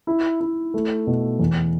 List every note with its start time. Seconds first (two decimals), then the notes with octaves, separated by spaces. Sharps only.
0.07 E4
0.41 E4
0.74 A3
1.07 B2
1.40 E2